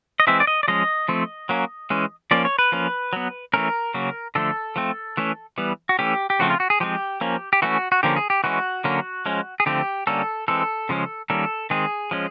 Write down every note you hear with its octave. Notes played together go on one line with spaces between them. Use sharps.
D#5
E3 G#3 C4 E5
D5
D#5
D5
F3 G#3 C#4 D#5
F3 A3 C4
F#3 A#3 C#4
E3 G#3 C#4
F3 A#3 C#4 D5
C#5
B4
F3 A#3 C#4
F#3 B3
E3 A3 C#4 A#4
C#3 F#3 A#3 C#4
D3 F3 A3 A4
F3 A3 C4
E3 A3 C#4
E3 G3 B3
F#4
E3 A3 C#4 G4
G4
C#3 F3 A3 C4 F#4
F4
F#4
G#4
F3 G#3 C4 G4
F3 A#3 C#4
G4
E3 A3 C#4 F#4
F#4
D3 F3 A#3 C#4 G4
G#4
G4
E3 G#3 C#4 F#4
D3 F#3 A#3 C#4
F3 G#3 C#4
G#4
D3 F3 A3 C4 G4
D3 G3 A#3 C#4 A4
E3 G#3 C4 A4
C#3 F3 G#3 C#4
D#3 G3 A#3 C#4 A4
D#3 G#3 C4 G#4
F3 G#3 C#4